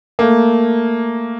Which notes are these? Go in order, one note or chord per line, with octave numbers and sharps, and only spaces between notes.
A3 A#3